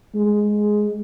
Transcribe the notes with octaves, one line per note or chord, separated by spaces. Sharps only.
G#3